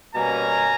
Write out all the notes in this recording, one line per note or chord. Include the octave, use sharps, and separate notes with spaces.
B2 G3 A#3 C#4 G#5 A#5